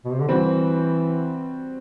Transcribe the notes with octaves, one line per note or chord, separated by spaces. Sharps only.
B2
C3
D3
E3 G3 C4 F#4